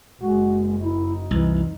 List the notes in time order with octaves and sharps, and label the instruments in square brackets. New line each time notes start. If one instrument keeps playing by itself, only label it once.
[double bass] F#1 F#2 [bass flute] G#3 [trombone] F#4
[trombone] D#4 [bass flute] E4
[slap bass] C2 [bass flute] E3